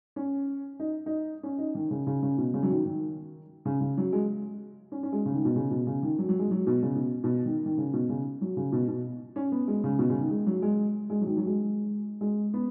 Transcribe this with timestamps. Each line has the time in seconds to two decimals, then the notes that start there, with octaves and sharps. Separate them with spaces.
0.16 C#4
0.80 D#4
1.06 D#4
1.43 C#4
1.58 D#4
1.75 D#3
1.91 C#3
2.07 C#3
2.23 C#3
2.38 B2
2.54 C#3
2.63 F#3
2.70 D#3
2.85 D#3
3.65 C#3
3.81 C#3
3.97 F#3
4.13 G#3
4.92 C#4
5.03 C#4
5.12 G#3
5.26 C#3
5.34 D#3
5.45 B2
5.56 C#3
5.71 B2
5.87 C#3
6.03 D#3
6.18 F#3
6.29 F#3
6.39 G#3
6.51 F#3
6.67 B2
6.82 C#3
6.95 B2
7.24 B2
7.46 D#3
7.66 D#3
7.77 C#3
7.93 B2
8.09 C#3
8.41 F#3
8.57 C#3
8.72 B2
8.88 B2
9.36 C#4
9.52 B3
9.68 G#3
9.84 C#3
9.99 B2
10.10 C#3
10.20 D#3
10.31 G#3
10.46 F#3
10.62 G#3
11.10 G#3
11.21 F#3
11.26 D#3
11.37 F#3
11.47 G#3
12.21 G#3
12.54 B3